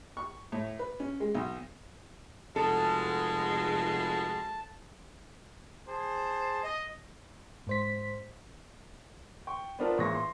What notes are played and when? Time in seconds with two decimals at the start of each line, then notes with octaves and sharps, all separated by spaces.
0.17 C#6
0.52 A2
0.79 B4
1.00 C#4
1.20 G#3
1.35 B1
2.56 F1 B2 G#3 A4 A5
5.88 G#4 C5 A5
6.64 D#5
7.67 G#2 C5 B6
9.47 G5 C#6
9.79 B3 C4 D4 F4 A#4 A5
9.98 A1 A#2 G#4 C#6 A#6
10.15 C6